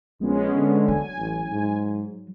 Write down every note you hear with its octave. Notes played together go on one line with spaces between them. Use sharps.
A#1 G#3 B3 C#4
D3
F#3 G#5
A1
G#2